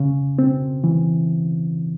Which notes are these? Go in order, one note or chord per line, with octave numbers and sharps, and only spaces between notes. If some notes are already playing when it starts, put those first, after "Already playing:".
Already playing: C#3
C4
E3